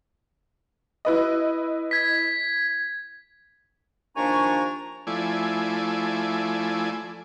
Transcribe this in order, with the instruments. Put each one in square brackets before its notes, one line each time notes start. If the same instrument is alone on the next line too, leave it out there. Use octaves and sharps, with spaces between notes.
[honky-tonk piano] E4 B4 D#5
[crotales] G#6 B6
[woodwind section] D#2 F3 D4 G#5 A#5 C#6
[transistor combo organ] F3 A3 E4 D5 G#5